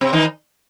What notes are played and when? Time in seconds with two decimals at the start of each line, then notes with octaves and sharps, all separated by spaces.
0.01 C3 C4
0.13 D#3 D#4